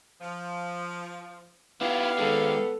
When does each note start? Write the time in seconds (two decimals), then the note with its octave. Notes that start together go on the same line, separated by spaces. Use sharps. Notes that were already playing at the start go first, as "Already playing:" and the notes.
0.21 F3
1.81 B3 E4 F4 G4 D5 F5
2.18 D#3 G#3 A4